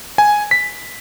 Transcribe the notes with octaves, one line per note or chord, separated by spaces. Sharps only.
G#5
B6